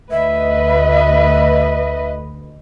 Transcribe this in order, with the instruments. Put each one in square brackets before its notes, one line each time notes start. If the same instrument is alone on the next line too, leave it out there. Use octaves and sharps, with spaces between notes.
[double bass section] D2 [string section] B4 D#5 [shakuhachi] E5